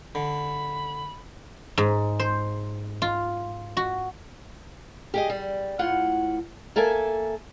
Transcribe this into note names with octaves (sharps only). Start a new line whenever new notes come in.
D3 B5
G#2
C5
F4
F#4
G4 G#4 D#5
G3
A2 F4 F#5
A#3 A4 E5 G#5 A5